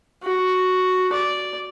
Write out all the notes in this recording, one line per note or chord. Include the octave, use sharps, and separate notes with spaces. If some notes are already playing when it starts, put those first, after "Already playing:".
F#4
D5